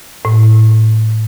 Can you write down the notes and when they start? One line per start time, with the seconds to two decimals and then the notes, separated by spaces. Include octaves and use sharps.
0.25 A2